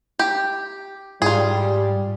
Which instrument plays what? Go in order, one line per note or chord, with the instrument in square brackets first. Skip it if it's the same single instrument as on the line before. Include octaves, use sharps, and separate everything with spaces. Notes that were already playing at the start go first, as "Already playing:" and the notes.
[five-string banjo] G4
[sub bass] G#2 [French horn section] G3 [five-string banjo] F4 G#4